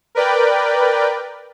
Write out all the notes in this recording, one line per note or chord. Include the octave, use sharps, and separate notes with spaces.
A#4 B4 D5 G5